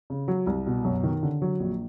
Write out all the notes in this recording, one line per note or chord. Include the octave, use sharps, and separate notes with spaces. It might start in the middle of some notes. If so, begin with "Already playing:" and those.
C#3
F#3
C2
B2
F#2
D#3
D3
F#3
A#1